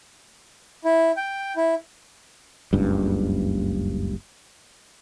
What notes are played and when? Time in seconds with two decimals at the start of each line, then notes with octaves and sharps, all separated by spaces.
0.84 E4
1.17 G5
1.56 E4
2.73 F#1 C#2 G2